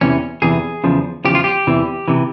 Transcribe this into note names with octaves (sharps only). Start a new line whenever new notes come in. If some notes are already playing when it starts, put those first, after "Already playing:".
E2 C3 E3 C#4
E2 C3 E3 G#4
E2 C#3 F3
E2 C#3 F3 G4
F4
G4
E2 C3 E3
C3 E3